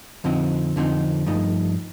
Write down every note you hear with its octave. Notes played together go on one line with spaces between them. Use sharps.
F2 D3 F3 C4 D#4
F2 D3 F3 C4 D#4
G2 F3 A3 D#4